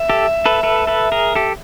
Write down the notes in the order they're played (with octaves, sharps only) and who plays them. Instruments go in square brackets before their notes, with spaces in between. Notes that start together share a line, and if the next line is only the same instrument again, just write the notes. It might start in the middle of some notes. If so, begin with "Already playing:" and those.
Already playing: [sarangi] E5
[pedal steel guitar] G4 A4
A4 B4
A4 B4
A4 B4
G#4 A#4
G4 A4